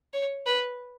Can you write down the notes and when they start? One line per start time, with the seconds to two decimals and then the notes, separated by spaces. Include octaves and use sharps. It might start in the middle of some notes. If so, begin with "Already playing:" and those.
0.14 C#5
0.47 B4